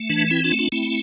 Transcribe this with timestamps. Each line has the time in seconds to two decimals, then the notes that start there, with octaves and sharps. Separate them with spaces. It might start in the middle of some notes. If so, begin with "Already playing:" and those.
Already playing: A3
0.09 E3 D4
0.31 C4 E4
0.44 D4 F4
0.52 A3
0.59 D4 F4
0.72 A3 C4 E4